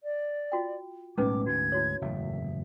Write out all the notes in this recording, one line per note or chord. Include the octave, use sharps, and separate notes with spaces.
D5
F4 F#4 G5
B1 A2 G#3 C#4 D#4 B4 D6
D2 G#2 F#4 G#6
E4 F#4 C#5
F#1 E2 A2 E5